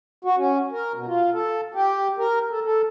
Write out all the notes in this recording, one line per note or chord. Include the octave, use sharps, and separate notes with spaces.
F#4
C#4
A#4
B2
F4
A4
G4
A#4
A4
A4